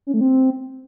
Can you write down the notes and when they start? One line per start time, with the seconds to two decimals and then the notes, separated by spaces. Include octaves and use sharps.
0.07 C#4
0.14 A3
0.21 C4